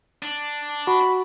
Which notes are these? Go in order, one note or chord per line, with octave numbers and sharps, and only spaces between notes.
D4
F#4 B5